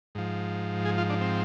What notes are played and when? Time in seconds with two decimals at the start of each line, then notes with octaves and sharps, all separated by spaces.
0.15 G#2 F3
0.85 G#4
0.98 F4
1.10 D4
1.21 C4